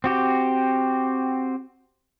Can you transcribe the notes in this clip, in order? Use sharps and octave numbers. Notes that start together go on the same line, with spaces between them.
C4 F#4 G4